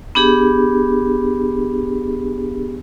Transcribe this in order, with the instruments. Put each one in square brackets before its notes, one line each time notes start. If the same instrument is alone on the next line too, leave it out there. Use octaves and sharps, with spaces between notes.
[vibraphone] B3 D4 G4 G#4